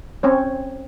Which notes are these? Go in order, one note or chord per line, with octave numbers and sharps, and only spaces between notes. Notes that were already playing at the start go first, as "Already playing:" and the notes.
C4 C#4 C#5